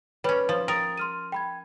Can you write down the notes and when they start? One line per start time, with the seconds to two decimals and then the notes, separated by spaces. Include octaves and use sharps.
0.24 G3 C#4 B4 C#5
0.49 F3
0.68 A#4 G5 D#6 A6
0.97 C6 F6 D#7
1.32 G5 B5 G#6